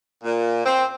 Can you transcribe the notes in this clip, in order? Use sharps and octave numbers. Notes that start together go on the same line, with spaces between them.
A#2
C4